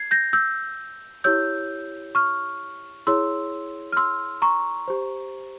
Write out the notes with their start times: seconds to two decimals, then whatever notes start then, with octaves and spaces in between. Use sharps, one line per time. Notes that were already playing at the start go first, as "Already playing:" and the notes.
Already playing: G#6 C7
0.11 G6 A#6
0.33 E6 G6
1.24 E4 G4 C#5 E6 G6
2.15 C#6 F6
3.07 E4 G#4 C#5 C6 E6
3.93 F6
3.97 C6 E6
4.42 A#5 C#6
4.88 G4 C5